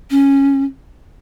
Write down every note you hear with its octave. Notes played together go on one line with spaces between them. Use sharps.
C#4